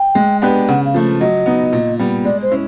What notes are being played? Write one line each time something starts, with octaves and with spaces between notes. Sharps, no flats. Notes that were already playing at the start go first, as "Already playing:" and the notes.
Already playing: G5
G#3
B3 D4 G4 B4
C#3 F#5
F5
F3 A3
F#3 D#5
B3 D#4
A#2
G3 B3
G#3 D5
C5
C#4 E4